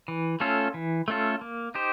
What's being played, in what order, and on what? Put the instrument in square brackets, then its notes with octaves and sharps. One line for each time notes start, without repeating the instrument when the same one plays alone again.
[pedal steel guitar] E3
A3 C#4 F4 A4
E3
A3 C#4 F4 A4
A#3
D#4 G4 C5